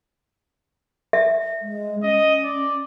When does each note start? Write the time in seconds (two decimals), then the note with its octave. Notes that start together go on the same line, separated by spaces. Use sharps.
1.13 E5
1.62 G#3
2.03 C#4 D#5
2.44 D5